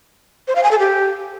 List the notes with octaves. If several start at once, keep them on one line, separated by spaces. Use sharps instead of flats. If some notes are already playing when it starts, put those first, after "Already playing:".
C5
F5
G#5
A4
G4